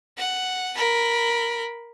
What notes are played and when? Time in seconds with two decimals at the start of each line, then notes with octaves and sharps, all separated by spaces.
0.18 F#5
0.76 A#4 B5